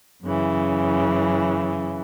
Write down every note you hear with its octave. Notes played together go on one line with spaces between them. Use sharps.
F#2 C#3 E3